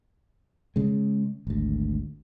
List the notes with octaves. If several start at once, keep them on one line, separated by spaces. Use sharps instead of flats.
C#3 G#3
G#1 D2